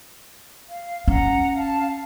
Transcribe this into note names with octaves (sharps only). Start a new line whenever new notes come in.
F5
C#4 F#5 A#5
F5 A5